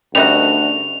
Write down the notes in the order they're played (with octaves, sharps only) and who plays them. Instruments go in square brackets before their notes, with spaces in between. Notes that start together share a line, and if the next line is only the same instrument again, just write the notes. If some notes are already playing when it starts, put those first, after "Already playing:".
[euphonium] D2 [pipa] G3 D#4 F#4 [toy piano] C#4 A#4 E5 [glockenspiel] F7